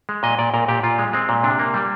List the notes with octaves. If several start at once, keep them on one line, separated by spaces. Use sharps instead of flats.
G#3
A#2 D#5
A#2 D5
A#2 A#4
A#2 G4
A#2 F4
G#3
G#3 C4
A#2
C3 D4
A#3
G3